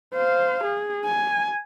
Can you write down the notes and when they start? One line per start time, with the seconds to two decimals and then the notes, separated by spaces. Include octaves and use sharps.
0.14 C5 F5
0.65 G#4
1.05 G#5